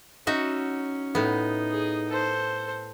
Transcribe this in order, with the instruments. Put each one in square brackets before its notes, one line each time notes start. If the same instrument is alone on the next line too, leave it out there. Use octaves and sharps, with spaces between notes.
[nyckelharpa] C#4 [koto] D#4 F#4 E5
[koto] A2 B3 [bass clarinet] D#4
[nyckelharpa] G#4
A4 C5